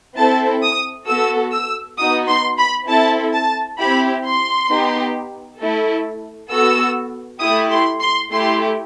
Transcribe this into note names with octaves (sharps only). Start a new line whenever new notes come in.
C4 E4 A4 A5
D#6
B3 F#4 A4 E6
E6
B3 D#4 F#4 D#6
C6
B5
C4 E4 A4 A5
A5
C4 E4 G4 B5
C6
B3 D#4 G4
A3 E4 A4
B3 F#4 A4 E6
A3 E4 G4 D#6
C6
C6
A3 E4 G4 C6